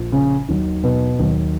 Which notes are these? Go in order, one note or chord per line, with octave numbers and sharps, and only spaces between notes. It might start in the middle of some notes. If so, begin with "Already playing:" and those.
Already playing: A#1 A#2 F3
C#3 C#4
D#2 D#3 F#3
B2 B3
D#2 D#3 F#3